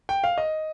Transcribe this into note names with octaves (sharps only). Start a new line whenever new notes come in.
G5
F5
D#5